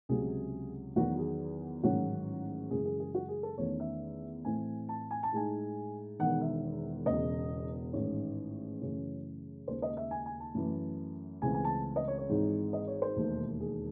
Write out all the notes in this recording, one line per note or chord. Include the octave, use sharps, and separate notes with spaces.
C#2 C3 F#3 G#4
E2 D#3 F#3 F#4
G#4
A1 G#2 D#3 F#3 C#4 F#4
F#2 C#3 E3 G#3 G#4
G#4
G#4
F#4
G#4
A4
E2 D#3 A3 C#4 C#5
E5
A2 E3 A3 C4 G#5
A5
G#5
A5
A2 G#3 D#4 G#5
E1 E2 D#3 F#5
E5
E1 E2 C#3 D#5
A1 G#2 D#3 C#5
F#2 C#3 E3 A3 C#4
D#2 C#3 G#3 C5
D#5
E5
G#5
G#5
A5
F#2 E3 A3
C#2 C#3 E3 A3 C4 G#5
G#5
A5
D#5
C#5
C#5
G#1 G#2 E3 G#3 D#4
D#5
C#5
C5
E1 D#2 D#3 A3 D#4
G#4